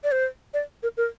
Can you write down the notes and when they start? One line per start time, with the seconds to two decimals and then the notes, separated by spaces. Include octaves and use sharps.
0.04 D5
0.12 C5
0.54 D5
0.83 A#4
0.97 A#4